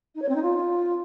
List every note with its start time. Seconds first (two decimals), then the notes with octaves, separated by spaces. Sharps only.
0.15 D#4
0.21 C#5
0.28 C4
0.35 D#4
0.42 F4